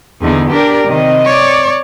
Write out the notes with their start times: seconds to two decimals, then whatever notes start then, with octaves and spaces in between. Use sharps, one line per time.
0.21 E2 D3 B3 D#4 G#4
0.51 D4 G4 A#4 D5
0.88 C3 D#3 C4 D#5
1.25 C#5 D5